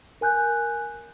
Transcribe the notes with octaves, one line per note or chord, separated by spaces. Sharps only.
A#4 G#5 F#6 G6